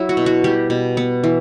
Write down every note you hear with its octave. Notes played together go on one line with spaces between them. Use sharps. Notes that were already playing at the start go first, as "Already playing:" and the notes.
Already playing: F#3 E4
F#4
B2
F#4
G3 G4
B2
B3
E3